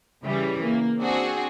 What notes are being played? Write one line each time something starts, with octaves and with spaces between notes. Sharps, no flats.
C#3 E3 G3
A#3
C4 D4 F#4 G#4